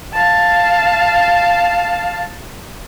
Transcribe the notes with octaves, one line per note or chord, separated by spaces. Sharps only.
F5 A5